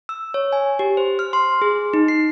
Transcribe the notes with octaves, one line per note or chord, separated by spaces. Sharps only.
E6
C#5
G#5
G4
C5
F6
C6
G#4
D#4
C7